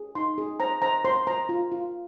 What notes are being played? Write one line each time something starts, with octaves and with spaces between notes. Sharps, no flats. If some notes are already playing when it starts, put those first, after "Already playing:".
Already playing: G#4
D#4 C6
G#4
C5 A#5
C5 A#5
C5 C6
C5 A#5
F4
F4